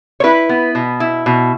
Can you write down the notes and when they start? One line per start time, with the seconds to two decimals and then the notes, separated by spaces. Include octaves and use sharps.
0.20 C#5
0.24 E4 B4
0.49 B3
0.75 B2
1.00 E4
1.26 B2